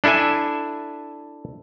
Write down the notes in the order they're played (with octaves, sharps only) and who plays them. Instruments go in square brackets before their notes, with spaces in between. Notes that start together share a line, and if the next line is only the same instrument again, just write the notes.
[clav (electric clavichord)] D4 E4 A4 E5 G#5